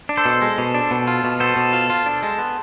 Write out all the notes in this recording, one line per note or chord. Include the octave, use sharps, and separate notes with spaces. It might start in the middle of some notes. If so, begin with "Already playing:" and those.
D4
A4 C5
B2
G#3
B2
D4
B2
F4
B2
B3 A4 C5
B2
F4
F4
D4
G#3
B3